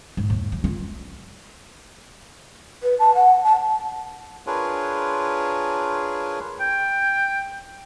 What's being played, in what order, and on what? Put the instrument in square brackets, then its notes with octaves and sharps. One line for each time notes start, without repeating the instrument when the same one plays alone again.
[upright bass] G#2
D#2
F3
F4
[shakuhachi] B4
A5
F#5
A5
[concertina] D4 F4 G#4 A#4 B4 C#5
[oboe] G5